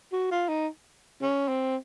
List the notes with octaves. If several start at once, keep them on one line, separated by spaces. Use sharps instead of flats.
F#4
F4
D#4
C#4
C4